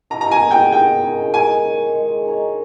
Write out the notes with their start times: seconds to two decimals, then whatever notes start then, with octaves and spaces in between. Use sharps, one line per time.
0.10 D#3 A#5
0.21 A#5
0.31 G#5
0.41 A#3 D#4 G#4
0.51 G5
0.72 D#3 G5
1.02 A#3 D#4 G#4
1.33 G#3 G#5
1.65 D#4 A#4 C#5
1.95 G#3
2.25 D#4 A#4 C#5